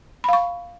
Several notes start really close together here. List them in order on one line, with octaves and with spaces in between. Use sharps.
B5 F5 C#6